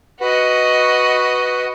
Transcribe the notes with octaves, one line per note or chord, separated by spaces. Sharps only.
F#4 B4 D#5 F#5